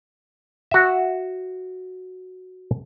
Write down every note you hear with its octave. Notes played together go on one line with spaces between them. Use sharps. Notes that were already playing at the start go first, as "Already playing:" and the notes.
F#4 E5